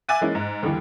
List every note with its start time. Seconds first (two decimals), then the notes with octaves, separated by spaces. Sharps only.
0.09 E5 G#5 D6 F#6 A6 D#7
0.21 E3 G#3 A#3 C#4 E4
0.35 G#2
0.62 D#2 D3 E3 G3